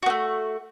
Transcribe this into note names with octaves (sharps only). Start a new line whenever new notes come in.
A3 B3 F#4